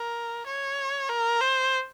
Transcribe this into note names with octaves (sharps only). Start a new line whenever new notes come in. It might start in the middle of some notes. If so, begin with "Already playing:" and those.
Already playing: A#4
C#5
A#4
C5